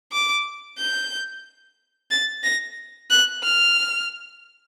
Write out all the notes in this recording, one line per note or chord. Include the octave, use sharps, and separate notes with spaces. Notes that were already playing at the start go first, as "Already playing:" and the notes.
D6
G6
A6
A#6
F#6
F6